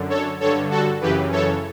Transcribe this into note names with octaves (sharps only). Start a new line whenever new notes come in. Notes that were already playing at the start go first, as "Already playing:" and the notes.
Already playing: F#2 D3
A4 C#5
G2 D3 A4 C#5
F#4 A4
F#2 C#3 E3 G4 B4
A4 C#5